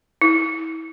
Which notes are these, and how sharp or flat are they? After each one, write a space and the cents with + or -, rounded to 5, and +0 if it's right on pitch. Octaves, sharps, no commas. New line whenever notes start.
E4 -30